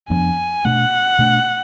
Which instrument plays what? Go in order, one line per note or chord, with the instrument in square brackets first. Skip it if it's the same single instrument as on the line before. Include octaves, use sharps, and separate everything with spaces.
[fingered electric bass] F2 F3 B3 D4 [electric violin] G#5
[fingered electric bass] B2 A3 D4 [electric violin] F#5
[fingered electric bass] B2 A3 D4